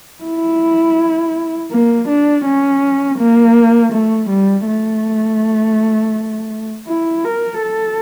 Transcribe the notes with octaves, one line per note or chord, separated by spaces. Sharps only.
E4
A#3
D4
C#4
A#3
A3
G3
A3
E4
A#4
A4